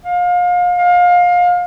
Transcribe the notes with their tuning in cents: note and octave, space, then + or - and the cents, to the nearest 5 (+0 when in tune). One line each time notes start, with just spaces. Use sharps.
F5 +30
F5 +25